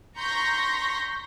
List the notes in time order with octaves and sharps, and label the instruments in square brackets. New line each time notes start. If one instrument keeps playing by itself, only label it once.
[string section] A#5 C6 C#6 G6 A#6 B6